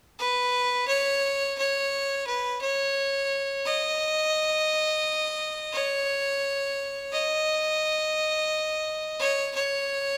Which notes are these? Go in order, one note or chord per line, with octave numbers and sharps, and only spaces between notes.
B4
C#5
C#5
B4
C#5
D#5
C#5
D#5
C#5
C#5